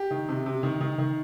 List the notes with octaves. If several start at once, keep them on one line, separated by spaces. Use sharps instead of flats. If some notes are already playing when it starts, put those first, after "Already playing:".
Already playing: G4
D#3
C3
C3
D#3
D#3
D#3